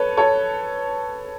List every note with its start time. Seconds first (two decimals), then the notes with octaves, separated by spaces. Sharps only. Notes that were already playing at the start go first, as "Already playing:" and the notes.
Already playing: A4 B4 C#5
0.17 A4 C#5